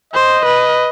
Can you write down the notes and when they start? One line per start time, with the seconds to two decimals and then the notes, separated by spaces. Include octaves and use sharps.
0.13 C5 D#5
0.46 B4